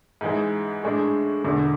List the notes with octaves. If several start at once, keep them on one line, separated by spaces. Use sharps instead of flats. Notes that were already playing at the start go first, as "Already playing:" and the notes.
G#2 E3 G#3
A2 G#3 D4
E1 E2 D3